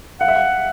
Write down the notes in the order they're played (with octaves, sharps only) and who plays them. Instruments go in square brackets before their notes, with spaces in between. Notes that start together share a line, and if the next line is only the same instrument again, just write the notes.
[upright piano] F5 [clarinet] F#5
[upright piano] E5
F5